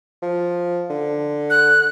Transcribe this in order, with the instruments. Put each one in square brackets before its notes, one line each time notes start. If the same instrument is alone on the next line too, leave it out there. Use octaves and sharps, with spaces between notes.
[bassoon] F3
D3
[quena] F#6